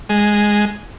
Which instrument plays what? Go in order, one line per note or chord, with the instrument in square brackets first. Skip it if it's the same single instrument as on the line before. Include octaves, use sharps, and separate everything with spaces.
[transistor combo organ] G#3